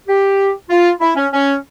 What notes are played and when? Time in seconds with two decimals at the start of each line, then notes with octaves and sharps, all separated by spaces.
0.08 G4
0.70 F4
1.01 E4
1.16 C#4
1.33 C#4